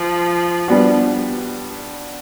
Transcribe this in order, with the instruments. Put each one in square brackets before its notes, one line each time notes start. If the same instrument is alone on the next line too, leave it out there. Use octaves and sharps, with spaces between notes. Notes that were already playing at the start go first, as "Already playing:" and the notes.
Already playing: [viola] F3
[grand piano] G3 B3 D4 F#4